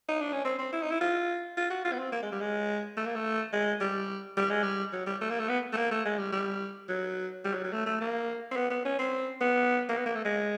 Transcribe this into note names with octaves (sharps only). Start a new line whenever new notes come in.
D#4
D4
C#4
C4
C4
E4
D#4
E4
F4
F4
F#4
F4
B3
C4
A#3
G#3
G3
G#3
A3
A#3
A3
G#3
G3
G3
G#3
G3
F#3
G3
A3
A#3
A3
B3
A3
A#3
A3
G#3
G3
G3
F#3
G3
F#3
F#3
A3
A3
A#3
C4
B3
B3
C#4
C4
B3
A#3
B3
A#3
A3
G#3